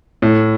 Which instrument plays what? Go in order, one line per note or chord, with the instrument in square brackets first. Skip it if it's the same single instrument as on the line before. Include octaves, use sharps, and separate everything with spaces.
[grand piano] A2